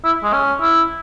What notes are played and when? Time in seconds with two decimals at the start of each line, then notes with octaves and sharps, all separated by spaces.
0.04 E4
0.23 G#3
0.33 C#4
0.61 E4